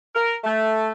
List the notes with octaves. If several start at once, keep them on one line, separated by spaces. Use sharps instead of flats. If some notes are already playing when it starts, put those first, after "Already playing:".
A#4
A3